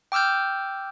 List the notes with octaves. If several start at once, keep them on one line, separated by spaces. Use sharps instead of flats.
G5 D6 E6 F6 G6